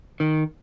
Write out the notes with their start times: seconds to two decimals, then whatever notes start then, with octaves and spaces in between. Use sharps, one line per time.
0.20 D#3